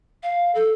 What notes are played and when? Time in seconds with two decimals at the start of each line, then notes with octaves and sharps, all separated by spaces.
0.23 F5
0.55 A4